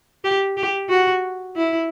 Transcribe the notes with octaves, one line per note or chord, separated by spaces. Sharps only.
G4
G4
F#4
E4